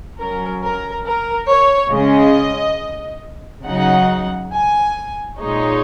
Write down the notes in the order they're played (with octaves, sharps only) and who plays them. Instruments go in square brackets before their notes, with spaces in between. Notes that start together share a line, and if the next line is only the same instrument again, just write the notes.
[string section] F#3 C#4 A#4
A#4
A#4
C#5
C#3 G#3 C#4 D#5
C#3 F#3 D#4 F#5
G#5
A#2 G#3 D#4 C#5